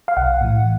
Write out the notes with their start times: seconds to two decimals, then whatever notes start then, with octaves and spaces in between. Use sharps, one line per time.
0.08 F5
0.17 B1 F#5
0.41 A2 E3